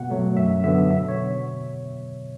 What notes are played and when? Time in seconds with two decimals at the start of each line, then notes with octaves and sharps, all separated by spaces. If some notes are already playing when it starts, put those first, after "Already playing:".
Already playing: B2 F#5
0.10 F#3 A3
0.36 F#2 E5
0.64 D3 F#3 B3 E5
0.91 B2 E5
1.08 C#5